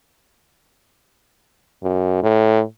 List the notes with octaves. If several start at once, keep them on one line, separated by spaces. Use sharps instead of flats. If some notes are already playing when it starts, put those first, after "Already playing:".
F#2
A2